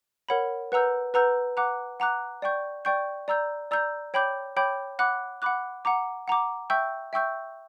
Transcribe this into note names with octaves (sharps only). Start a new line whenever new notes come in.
A#4 C#5 F#5 B5
B4 F#5 A#5 E6 G6
B4 F#5 A#5 E6 G6
F#5 A#5 D6 F#6
F#5 A#5 D6 F#6
D5 G5 C#6 G6
D5 G5 C#6 G6
D5 A#5 E6 G6
D5 A#5 E6 G6
C#5 G5 B5 D6 G6
C#5 G5 B5 D6 G6
F#5 B5 D6 F#6
F#5 B5 D6 F#6
F#5 A#5 D6
F#5 A#5 D6
E5 G5 C#6 E6 G6
E5 G5 C#6 E6 G6